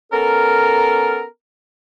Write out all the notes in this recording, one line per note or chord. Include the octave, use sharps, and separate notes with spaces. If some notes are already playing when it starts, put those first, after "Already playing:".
B3 C#4 A4 A#4